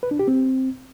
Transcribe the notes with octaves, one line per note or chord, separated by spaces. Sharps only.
B4
D4
G4
C4